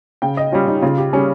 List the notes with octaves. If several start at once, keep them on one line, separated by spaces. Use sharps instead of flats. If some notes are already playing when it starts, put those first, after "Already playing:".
C#3 G5
D#5
G3 C#4 F4
D#4
C#3 F4
G4
G3 C#4 G#4